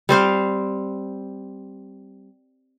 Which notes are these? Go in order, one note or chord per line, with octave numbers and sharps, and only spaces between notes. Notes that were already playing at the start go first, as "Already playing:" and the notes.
G3 C4 C5 F5